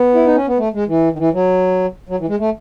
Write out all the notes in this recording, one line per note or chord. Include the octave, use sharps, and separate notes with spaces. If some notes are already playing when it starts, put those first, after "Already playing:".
Already playing: B3
E4
D#4
C#4
B3
A3
G#3
E3
D#3
E3
F#3
F#3
E3
G#3
A3